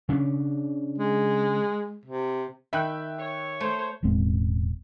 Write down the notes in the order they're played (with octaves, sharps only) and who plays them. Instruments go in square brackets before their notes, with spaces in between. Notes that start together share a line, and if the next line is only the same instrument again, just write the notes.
[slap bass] C#3 C#4 D4
[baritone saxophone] G#3
C3
[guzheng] D#3 B5 [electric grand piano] E5 G5 F#6
[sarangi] C#5
[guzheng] A3 [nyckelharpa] C5
[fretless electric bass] E1 A1 G#3 C4